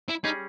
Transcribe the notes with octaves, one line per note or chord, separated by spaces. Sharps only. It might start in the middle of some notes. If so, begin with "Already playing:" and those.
E4
G3 C#4 D#4 G#4